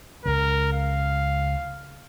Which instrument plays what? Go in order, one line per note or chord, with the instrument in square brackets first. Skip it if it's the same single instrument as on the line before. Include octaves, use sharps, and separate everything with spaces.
[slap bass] C#2 C#3 [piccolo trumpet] A#4
[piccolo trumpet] F5